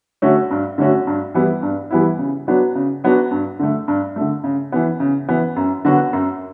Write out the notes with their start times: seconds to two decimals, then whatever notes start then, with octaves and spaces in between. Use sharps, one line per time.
0.22 D3 A3 C#4 F#4
0.51 G2
0.78 D3 A3 C#4 F#4
1.07 G2
1.34 E3 G3 B3 E4
1.62 G2
1.91 E3 G3 B3 E4
2.19 C#3
2.47 F#3 B3 D4 F#4
2.75 C#3
3.04 F#3 B3 D4 F#4
3.31 G2
3.59 D3 A3
3.88 G2
4.16 D3 A3
4.44 C#3
4.72 E3 B3
5.00 C#3
5.29 E3 B3
5.56 F#2
5.85 D3 F#3 B3 F#4
6.13 F#2